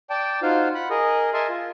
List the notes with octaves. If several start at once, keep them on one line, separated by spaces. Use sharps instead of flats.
D5 G5 A5
D#4 F4 F#4 C5 F5
F#5 B5
G#4 A#4 D#5
A#4 D#5 E5 G#5 A5 C6
F4